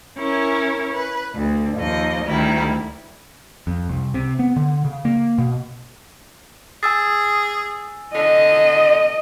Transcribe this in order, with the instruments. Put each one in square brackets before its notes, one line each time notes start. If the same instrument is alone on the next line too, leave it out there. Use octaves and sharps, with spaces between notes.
[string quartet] C#4 E4 A#4 C#5
B4
D2
D#2 F3 D#5
D2 D#3 G3 E4
[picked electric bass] F2
C2
C3
B3
D3
C#3
A#3
B2
[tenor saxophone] G#4 [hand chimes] G#5 E6 A6
[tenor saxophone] D3 [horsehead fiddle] D#5